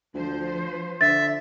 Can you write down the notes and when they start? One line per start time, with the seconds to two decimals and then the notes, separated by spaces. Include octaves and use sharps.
0.14 D2 F3 C5
1.01 D3 E5 A6